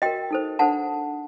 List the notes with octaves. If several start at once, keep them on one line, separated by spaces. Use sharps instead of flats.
F#4 A#4 D#5 G5
D#4 A4 C5
D4 A4 C5 F#5 A5